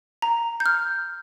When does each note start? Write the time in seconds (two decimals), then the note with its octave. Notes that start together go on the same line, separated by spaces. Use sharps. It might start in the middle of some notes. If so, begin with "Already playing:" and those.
0.22 A#5
0.60 G6
0.66 F6